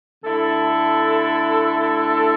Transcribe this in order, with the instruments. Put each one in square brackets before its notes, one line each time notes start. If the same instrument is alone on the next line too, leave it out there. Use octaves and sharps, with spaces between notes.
[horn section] D3 A3 E4 A4